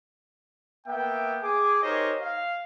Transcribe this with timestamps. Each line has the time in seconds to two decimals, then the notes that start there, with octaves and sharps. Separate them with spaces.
0.87 A#3 B3 E5 G5
1.42 G#4 G#5 D6
1.82 D#4 G4 A#4 C5 C#5 D#5
2.20 F5